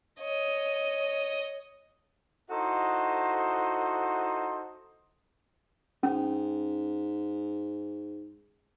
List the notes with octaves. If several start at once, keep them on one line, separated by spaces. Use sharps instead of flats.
C#5 D#5
D#4 E4 F#4 A4 C5 D#5
G#2 C#4